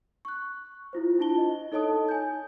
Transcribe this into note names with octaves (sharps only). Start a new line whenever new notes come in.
C#6 F#6
E4 F4 C5
D4 E4 F4 A5 G7
D#5
D#4 A4 C#5 D#5 A5 D#6
G#5 G6